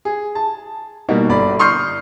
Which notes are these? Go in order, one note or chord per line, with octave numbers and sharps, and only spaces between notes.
G#4
A5
B2 G3 A#3 D#4 F#4
G1 D5 B5
C6 C#6 D#6 F6 G6 C7